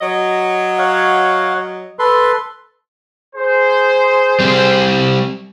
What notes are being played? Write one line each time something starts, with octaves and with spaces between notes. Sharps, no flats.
F#3 D#5
C#5 F5 F#5
A4 B4 C6
G#4 C5
G3 C4